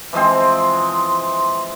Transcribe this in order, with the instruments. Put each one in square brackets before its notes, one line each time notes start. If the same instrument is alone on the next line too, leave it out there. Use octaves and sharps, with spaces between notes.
[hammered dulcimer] E3 F3 G#3 C4